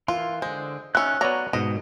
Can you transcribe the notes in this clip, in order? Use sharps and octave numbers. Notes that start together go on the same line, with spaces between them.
E3 F4 A#4 C6
D3 G#3 C5
D#3 C#4 E5 E6 F#6
F#3 B3 C#5 D5 A#5
G#2 B2 D#5